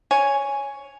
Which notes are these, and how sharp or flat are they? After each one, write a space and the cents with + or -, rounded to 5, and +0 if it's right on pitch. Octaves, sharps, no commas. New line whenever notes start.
C#5 +10 G#5 +0